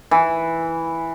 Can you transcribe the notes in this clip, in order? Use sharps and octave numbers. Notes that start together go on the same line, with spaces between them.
E3